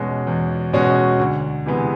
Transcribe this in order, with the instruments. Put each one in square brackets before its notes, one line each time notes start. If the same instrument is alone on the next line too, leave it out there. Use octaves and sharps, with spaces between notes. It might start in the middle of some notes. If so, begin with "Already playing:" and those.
Already playing: [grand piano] E2 B2 G#3 C#4 F#4
E2
B2 G#3 C#4 F#4
D2
C3 E3 G#3 B3